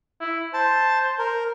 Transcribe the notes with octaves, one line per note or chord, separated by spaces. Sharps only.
E4
C5 A5
A#4